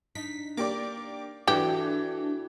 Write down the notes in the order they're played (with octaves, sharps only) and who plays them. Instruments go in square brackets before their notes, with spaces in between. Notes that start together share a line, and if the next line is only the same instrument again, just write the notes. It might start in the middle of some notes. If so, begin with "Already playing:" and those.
[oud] D4 D#4 [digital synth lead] B6
[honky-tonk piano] A#3 G4 D5 [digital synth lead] D6
[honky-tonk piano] E3 [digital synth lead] D4 [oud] E4 F#4 A4 [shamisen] G4